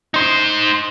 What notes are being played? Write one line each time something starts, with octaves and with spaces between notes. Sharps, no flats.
D#4 C5